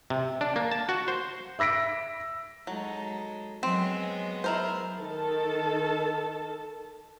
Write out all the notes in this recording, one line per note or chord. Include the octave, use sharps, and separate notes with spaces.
C3
D4
A#3
A5
F#4
C5
E5 E6 A#6 B6 D7
F#3 G#3 D#4 A4
F#3 G#3 B3 C4
E4 A#4 C5
D#3 A4 A5